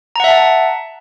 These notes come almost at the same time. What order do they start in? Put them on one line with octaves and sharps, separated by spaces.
A#5 F#5 E5 A5